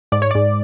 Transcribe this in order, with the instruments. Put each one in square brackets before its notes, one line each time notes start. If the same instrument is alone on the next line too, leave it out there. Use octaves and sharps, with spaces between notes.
[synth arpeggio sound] G#2 D5
C#5
G#2 D5